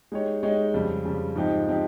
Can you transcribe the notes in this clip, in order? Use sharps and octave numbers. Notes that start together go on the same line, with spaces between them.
G#3 D#4 G4 C#5
G#3 D#4 G4 C#5
F2 C#3 G3
F2 C#3 G3
G#2 F3 C4 D#4 G4
F3 C4 D#4 G4